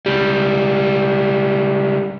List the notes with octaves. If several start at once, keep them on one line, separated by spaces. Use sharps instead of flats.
C#2 G3